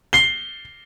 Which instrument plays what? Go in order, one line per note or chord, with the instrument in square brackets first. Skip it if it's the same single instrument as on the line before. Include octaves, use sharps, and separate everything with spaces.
[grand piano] C7 G7